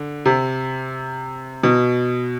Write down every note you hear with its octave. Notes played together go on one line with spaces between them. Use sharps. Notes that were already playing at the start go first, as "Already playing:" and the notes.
Already playing: D3
C3
B2